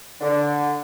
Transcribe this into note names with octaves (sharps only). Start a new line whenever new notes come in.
D3